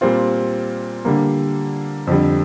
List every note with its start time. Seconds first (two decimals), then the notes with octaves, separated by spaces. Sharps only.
0.01 A#2 G3 C4 F4
1.05 D3 G3 A#3
2.07 F2 D3 G3